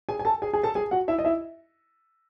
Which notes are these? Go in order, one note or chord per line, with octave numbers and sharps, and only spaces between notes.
G#4 G#5
G#5
A4 A5
G#4 G#5
G#4 G#5
A4 A5
G#4 G#5
F#4 F#5
E4 E5
D#5
E4 E5